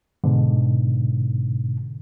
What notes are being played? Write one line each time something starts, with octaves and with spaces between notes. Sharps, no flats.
G#2 B2 D3